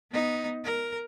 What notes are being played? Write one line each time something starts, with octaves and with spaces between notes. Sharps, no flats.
B3 D#4
A#4